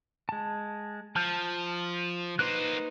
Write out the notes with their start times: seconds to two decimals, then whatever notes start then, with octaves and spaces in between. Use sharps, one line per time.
0.29 G#3 A5
1.16 F3 A5 F6 G6
2.39 A#3 D#4 B4 C5 F#6